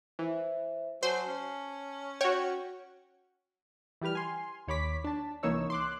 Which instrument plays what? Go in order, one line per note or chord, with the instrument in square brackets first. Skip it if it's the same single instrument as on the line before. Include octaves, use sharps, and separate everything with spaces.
[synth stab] E3 [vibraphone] C5 E5
[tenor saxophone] F#3 [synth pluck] C5 [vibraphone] G#5 A5
[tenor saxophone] C#4
[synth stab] F#4 G5 [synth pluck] C#5 [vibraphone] F#5
[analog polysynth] E3 G3 G4 B4 F6
G#5 C6
D#2 C#5 B5 D6 B6
D4 A5
C2 E3 A#3 D#4 C#5 E6
C6 D6 F#6